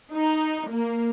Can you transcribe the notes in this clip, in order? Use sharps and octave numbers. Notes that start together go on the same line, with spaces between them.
D#4
A#3